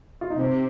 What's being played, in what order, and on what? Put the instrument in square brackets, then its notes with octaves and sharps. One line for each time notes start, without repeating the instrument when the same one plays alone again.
[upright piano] F4
D#4
[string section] C3 [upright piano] C4